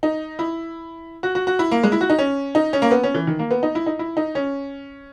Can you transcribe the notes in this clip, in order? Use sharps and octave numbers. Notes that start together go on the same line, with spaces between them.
D#4
E4
F#4
F#4
F#4
E4
A#3
G#3
E4
F#4
D#4
C#4
D#4
C#4
A#3
B3
C#4
E3
D#3
A#3
B3
D#4
E4
D#4
E4
D#4
C#4